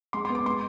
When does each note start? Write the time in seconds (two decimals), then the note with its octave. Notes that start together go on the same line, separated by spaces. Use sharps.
0.13 G#3 C6
0.25 C6
0.30 B3
0.35 D6
0.46 G#3 C6